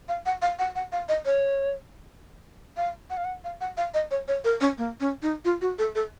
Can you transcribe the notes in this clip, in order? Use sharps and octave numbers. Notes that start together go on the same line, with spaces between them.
F5
F#5
F5
F#5
F#5
F5
D#5
C#5
F5
F#5
F5
F#5
F5
F#5
F5
D#5
C#5
C#5
A#4
C#4
A#3
C#4
D#4
F4
F#4
A4
A4